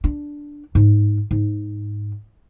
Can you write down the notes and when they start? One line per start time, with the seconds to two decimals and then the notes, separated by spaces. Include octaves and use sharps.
0.04 D4
0.75 G#2
1.31 G#2